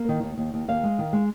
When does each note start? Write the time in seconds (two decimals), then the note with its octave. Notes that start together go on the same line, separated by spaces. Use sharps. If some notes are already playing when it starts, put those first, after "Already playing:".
Already playing: A#3
0.09 D#3
0.23 D#2
0.38 D#2
0.54 D#2
0.68 D#2 F5
0.83 G#3
0.99 D#3
1.13 G#3